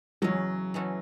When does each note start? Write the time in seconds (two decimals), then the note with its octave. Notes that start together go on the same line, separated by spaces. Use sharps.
0.22 E2 C#3 F#3 G#3 C#4
0.74 E3 G#3 C#4 F#4 A4